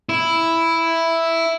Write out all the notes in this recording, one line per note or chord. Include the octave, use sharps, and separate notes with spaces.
E4